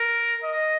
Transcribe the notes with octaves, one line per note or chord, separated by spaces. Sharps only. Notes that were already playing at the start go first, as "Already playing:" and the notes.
Already playing: A#4
D#5